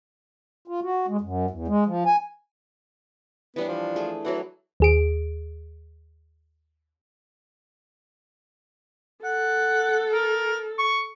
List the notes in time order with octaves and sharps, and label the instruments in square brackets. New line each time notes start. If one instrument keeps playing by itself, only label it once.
[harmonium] F4
F#4
G#3
F#2
E2
G#3
F3
G#5
[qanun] E3 G3 D4 [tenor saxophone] B3
[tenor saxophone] F3
[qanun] A3 G#4
[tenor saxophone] E3 [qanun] F#3 F#4 F#5
[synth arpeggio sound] D#2 G#4 D7
[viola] A4 [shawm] F#5
[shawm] A#4
C#6